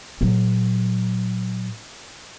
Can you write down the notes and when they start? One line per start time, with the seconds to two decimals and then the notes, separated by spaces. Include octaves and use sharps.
0.21 A#2 F#3